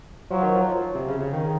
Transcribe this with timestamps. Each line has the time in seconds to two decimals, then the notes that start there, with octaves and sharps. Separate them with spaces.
0.31 F3 F#3
0.43 D#3
0.55 F3
0.95 C3
1.08 C#3
1.21 C#3
1.33 D#3